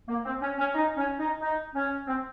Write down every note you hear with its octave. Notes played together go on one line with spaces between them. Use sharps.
A#3
C4
C#4
C#4
D#4
C#4
D#4
D#4
C#4
C4